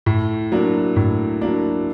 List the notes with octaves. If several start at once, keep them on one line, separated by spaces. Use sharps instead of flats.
A2
F#3 A#3 D4
A2
F#3 A#3 D4